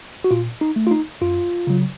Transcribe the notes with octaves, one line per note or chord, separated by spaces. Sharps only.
F#4
A#2 F4
D#4
A3
F4
D#4
F#2 F4
C#3 F#3